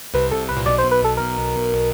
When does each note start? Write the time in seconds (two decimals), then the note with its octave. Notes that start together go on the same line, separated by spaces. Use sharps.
0.14 C2 C3 B4
0.31 A4
0.49 B4
0.57 A#2
0.66 B1 B2 D5
0.78 C5
0.91 B4
1.04 A4
1.17 A#4